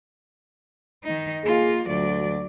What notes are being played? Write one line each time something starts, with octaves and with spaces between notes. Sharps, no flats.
D#3 D#4
A#3 F4 G#4
D2 F#3 D5